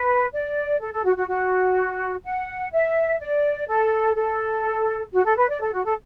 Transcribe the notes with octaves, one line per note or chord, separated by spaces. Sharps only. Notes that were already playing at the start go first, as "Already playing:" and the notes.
Already playing: B4
D5
A4
A4
F#4
F#4
F#4
F#5
E5
D5
A4
A4
F#4
A4
B4
D5
A4
F#4
A4